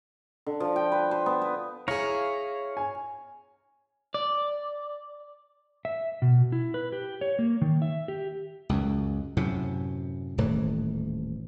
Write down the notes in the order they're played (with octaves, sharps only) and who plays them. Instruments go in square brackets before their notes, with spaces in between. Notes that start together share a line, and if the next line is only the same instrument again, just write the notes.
[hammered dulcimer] D3
F3
G5
B4
C5
B3
B4
[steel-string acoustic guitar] E4 G#4 [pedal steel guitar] C#5 F5 A#5
[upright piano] G#5
[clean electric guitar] D5
[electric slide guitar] E5
B2
E4
B4
G4
C#5
A#3
D#3
E5
G4
[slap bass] C#2 F#2
F#2 A2 C3
D#1 A2 D#3 E3